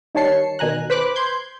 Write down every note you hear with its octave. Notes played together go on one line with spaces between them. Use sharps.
D#3 G3 C#5 A5 C7 C#7
B2 D#3 G#5 A#5 F#6
B4 C5 B5 D6 F#6
C6 G6 G#6